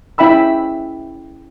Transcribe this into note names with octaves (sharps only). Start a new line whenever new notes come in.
C#4 E4 E5 G5 B5 E6